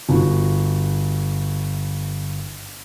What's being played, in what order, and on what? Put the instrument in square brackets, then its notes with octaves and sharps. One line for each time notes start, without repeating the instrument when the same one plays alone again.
[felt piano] G1 F#4